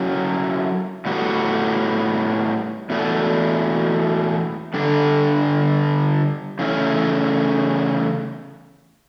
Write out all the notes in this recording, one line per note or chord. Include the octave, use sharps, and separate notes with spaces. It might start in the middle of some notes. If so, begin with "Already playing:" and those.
Already playing: F#3 C#4 E4 A4
A2 G3 B3 F#4
E2 B2 A3
D3 G3 D4 A4
C#3 E3 A3 C#4 E4